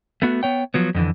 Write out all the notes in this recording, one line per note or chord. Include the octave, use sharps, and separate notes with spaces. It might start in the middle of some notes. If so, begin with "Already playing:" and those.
A3 B3 F#4
B3 C#5 G5
F3 F#3 B3
F2 D3 E3